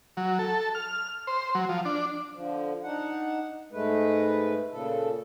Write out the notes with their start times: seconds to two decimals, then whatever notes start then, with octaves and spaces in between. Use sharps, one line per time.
0.17 F#3
0.39 A4
0.75 F6
1.27 C5
1.55 F#3
1.69 F3
1.85 D4
2.34 D3 F3
2.83 D4 D#4 F#5
3.72 G#2 G#3 A3 B4
4.70 A#2 C#3 A4